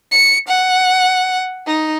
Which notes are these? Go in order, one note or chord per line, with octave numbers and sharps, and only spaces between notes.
C#7
F#5
D#4